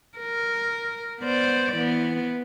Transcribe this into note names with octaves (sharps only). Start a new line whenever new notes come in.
A#4
B3 C5 D5
E3 B3